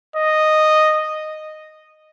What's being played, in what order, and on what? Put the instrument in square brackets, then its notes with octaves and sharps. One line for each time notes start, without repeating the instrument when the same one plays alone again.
[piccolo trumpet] D#5